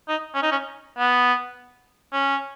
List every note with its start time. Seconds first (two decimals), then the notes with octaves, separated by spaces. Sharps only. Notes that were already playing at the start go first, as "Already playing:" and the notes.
0.09 D#4
0.35 C#4
0.43 D#4
0.52 C#4
0.99 B3
2.13 C#4